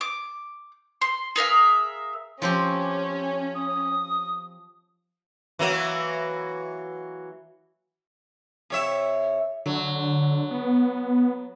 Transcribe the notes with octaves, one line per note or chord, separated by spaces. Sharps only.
D6
C6
G#4 A#4 E5 F5
F3 C4 C#4 G4
D#6
E3 F#3 A#3
C3 C#5 E5
D3 F#3
B3